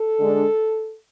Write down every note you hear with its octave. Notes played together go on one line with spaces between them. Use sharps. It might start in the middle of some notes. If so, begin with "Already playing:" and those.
Already playing: A4
D3 G#3 D4